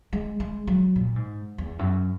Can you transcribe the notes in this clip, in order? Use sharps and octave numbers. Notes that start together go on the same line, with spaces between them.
G#3
G#3
F#3
A#2
G#2
E2
F#2